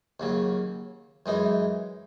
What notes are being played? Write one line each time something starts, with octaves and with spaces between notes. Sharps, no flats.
D#2 C#3 F#3
F#2 E3 G#3 D#4